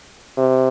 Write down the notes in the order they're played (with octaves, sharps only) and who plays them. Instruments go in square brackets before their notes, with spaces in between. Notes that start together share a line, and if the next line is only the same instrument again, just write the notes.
[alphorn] C3